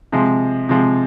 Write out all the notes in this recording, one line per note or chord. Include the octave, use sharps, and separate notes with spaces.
C3 F3 G#3
C3 F3 G#3